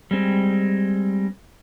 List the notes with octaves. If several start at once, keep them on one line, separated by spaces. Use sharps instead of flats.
G3 G#3 C4